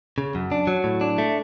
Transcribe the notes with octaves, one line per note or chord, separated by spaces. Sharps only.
C#3
F#2
D4
F#3
A2
D4
A3